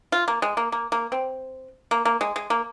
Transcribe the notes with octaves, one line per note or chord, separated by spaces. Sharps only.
F4
A#3
G#3
A#3
A#3
A#3
C4
A#3
A#3
G#3
G#3
A#3